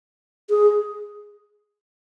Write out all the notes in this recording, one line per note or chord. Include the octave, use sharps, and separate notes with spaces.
G#4